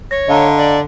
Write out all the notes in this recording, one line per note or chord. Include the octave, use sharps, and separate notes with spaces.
C#5 A#6
D3 D#5 F5 A#5
D5